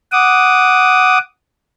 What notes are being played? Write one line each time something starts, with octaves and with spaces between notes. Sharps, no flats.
F#5 D6 D#6